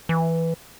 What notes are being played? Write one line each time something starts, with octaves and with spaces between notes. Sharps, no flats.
E3